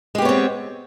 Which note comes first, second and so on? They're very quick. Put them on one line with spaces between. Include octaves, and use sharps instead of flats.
G#3 G4 B3 C#5 C4